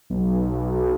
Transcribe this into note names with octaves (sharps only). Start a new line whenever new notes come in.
B1